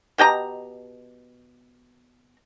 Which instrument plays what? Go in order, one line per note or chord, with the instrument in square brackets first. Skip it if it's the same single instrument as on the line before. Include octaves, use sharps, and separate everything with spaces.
[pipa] B2 G4 D#5 A#5